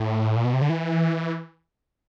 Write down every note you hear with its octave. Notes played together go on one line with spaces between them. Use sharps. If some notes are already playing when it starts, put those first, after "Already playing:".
Already playing: A2
A#2
B2
C3
D3
E3